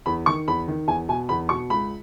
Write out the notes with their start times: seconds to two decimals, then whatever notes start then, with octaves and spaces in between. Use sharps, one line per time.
0.06 E2 B5
0.26 D#3 C#6
0.48 E2 B5
0.68 D#3
0.88 E2 G#5
1.09 B2 G#5
1.29 E2 B5
1.49 B2 C#6
1.70 C#2 B5